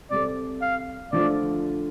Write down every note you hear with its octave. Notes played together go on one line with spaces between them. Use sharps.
C3 G3 C4 A4 D5
F5
D3 F3 A3 F4 D5